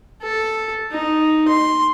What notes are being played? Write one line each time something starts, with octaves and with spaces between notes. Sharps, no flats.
A4
D#4
C6